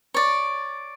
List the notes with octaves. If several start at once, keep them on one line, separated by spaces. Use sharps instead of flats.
C#5 D5